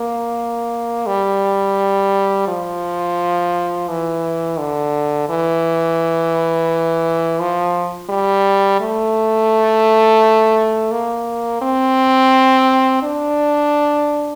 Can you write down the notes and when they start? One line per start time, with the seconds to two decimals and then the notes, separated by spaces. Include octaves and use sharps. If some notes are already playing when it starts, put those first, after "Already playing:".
Already playing: A#3
1.06 G3
2.48 F3
3.88 E3
4.59 D3
5.29 E3
7.40 F3
8.10 G3
8.80 A3
10.91 A#3
11.62 C4
13.02 D4